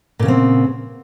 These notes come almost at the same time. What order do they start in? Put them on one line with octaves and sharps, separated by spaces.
A#2 C#3 B3 C4